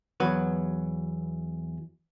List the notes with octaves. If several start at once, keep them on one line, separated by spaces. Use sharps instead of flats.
E2 F#3 B4